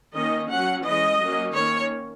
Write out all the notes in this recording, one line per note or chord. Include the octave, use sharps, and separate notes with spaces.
D#3 A#3 C#4 D#5
F#3 C#4 F#5
E3 G#3 C#4 D#5
F#3 A#3 C#4
D#3 A#3 C#4 C#5